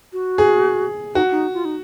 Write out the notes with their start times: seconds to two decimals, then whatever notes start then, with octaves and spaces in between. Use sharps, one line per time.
0.13 F#4
0.38 G#4
1.15 D#4 F#4
1.31 D#4
1.53 F4
1.65 D#4